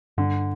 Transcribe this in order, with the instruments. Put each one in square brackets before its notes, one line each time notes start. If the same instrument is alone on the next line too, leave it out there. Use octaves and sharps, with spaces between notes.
[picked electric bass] G2 [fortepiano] D3